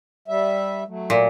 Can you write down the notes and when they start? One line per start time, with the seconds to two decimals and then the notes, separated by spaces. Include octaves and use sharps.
0.28 G3 E5
0.87 F#3 A3
1.10 A#2